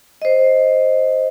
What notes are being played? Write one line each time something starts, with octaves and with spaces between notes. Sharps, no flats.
C5 D#5